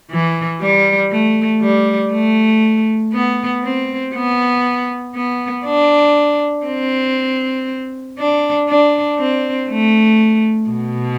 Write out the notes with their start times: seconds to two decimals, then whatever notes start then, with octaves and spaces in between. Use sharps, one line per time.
0.11 E3
0.61 G3
1.11 A3
1.62 G3
2.12 A3
3.13 B3
3.63 C4
4.14 B3
5.15 B3
5.65 D4
6.66 C4
8.18 D4
8.68 D4
9.19 C4
9.69 A3
10.70 B2